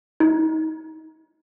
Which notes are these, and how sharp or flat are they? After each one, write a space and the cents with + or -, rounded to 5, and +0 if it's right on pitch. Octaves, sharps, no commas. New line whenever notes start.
D#4 +30